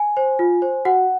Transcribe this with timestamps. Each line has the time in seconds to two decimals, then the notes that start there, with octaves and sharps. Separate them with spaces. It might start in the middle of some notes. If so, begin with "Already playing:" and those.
Already playing: G#5
0.17 C5
0.39 F4
0.62 C5
0.85 F#4 F#5